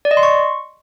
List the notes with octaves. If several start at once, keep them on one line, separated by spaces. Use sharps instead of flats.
D5
D#5
C6
C#6